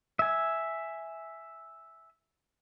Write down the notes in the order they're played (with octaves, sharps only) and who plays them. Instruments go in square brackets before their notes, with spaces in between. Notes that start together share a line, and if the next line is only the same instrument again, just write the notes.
[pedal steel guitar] E5 G#5